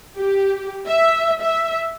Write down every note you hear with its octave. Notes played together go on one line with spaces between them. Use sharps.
G4
E5
E5